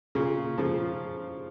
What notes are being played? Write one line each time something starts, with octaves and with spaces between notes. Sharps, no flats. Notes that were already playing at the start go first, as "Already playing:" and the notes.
A#2 C#3
C#3 F3